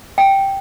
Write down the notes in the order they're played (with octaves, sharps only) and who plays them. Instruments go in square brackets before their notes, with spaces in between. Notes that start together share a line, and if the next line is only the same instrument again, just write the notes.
[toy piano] G5